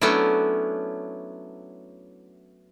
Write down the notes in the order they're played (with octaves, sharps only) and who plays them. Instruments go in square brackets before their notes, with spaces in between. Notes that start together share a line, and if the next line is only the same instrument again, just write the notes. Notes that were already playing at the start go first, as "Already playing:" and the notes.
[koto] F#3 A3 B3 C#4 D4 E4